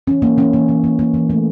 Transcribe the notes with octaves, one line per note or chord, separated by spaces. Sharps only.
E3 C#4
E3 A#3
E3 C#4
E3 A#3
E3
A#3
A#3
E3
A3